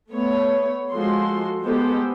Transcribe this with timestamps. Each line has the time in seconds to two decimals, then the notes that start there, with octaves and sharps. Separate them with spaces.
0.10 A3 B3 C#5
0.92 F3 G#3 F#4 A4 C6
1.64 G#3 B3 G4 A4 C5